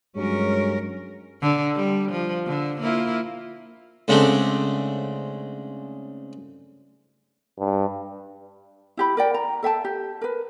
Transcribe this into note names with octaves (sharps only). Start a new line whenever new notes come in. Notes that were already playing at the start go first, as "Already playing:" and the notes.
G2 F#3 G#3 C#4 A#4
D3
G3
F3
D3
A#3 E4 F4
G#2 C#3 A3 C4 D4
G2
E4 G4 B5
A#4 D5 G5
A#5
A4 E5 G5 A5
G4
A#4 B4